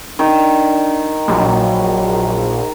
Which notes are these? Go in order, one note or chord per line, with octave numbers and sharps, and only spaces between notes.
D#3 D4
A#1 F#3